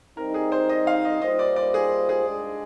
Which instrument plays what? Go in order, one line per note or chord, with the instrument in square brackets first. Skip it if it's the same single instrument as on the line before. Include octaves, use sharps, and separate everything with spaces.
[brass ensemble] G3 C4 D#4 [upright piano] A#4
[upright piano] G#4
C5
D#5
F5
D#5
[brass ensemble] G3 A#3 F4 C5 [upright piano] D#5
[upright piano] D5
D5
G#4
G#4
[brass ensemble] G#3 D4 G#4